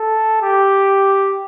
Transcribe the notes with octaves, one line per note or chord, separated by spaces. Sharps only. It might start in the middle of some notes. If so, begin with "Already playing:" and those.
Already playing: A4
G4